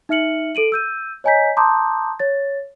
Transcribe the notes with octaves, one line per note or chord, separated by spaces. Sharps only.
D#4 E5 F6 C#7 F#7
A4 D7 D#7 F#7
E6 G6 D#7
C#5 D#5 G#5 A#5 G6 B6
A5 A#5 C6 D6 D#6 G6
C#5 A6